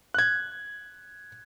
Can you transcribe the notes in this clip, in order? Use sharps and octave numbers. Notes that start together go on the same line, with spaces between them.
F#6 G#6